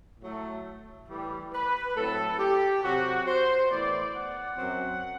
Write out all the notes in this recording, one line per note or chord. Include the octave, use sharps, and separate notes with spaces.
A2 F#3 A3
A2 E3 G3
B4
A2 F#3 C4 A4
G4
C3 F#3 C4 F#4
C5
A2 E3 B3 D5
F#5
F#2 F#3 C4